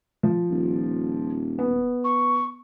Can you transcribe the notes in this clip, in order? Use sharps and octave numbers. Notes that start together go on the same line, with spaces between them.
F3
D#1
B3
C#6